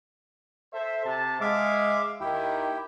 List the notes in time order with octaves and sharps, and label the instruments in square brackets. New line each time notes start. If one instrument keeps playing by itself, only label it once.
[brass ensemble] A4 C5 E5
C3 A5
[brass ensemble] G#3 [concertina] E5 F5 D6
[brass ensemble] D#2 D#3 [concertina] E4 G4